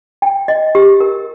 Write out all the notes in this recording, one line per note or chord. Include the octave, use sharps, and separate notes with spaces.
G5
D#5
G4
A#4